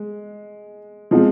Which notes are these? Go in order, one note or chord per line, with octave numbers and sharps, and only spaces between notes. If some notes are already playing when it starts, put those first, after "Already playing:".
Already playing: G#3
F3 G#3 C4 F4